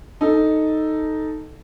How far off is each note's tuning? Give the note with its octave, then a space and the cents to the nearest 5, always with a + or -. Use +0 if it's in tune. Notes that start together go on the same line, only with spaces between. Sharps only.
D#4 +0 A4 +0